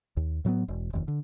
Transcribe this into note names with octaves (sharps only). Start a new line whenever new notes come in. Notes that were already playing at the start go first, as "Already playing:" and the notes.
D#2
A2 F#3 G3 B3
E1
F1 D#2
D3